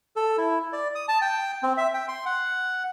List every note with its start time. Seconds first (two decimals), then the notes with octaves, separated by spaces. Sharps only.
0.16 A4
0.38 E4
0.73 D5
0.95 D#6
1.08 A5
1.22 G5
1.63 C4
1.77 E5
1.94 G5
2.08 C6
2.26 F#5